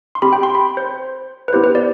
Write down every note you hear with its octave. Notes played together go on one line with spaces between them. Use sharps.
C6
C4 G4 B5
G5
C6
B5
C5
B4
B3 E4 G4 C5
B4
D5